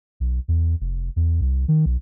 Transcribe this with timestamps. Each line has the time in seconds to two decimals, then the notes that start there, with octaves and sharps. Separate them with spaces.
0.20 B1
0.48 E2
0.81 F1
1.16 E2
1.41 C2
1.68 D#3
1.86 B1